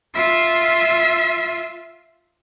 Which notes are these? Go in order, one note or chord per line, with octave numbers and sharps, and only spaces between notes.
F4 E5